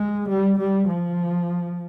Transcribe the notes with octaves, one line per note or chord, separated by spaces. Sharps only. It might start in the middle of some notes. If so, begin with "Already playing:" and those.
Already playing: G#3
G3
G3
F3